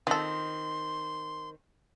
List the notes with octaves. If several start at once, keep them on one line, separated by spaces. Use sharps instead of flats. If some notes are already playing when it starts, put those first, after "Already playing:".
D#3 C4 F4 A4 C6